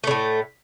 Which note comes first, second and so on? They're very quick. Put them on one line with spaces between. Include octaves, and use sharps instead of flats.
A3 C#3 A2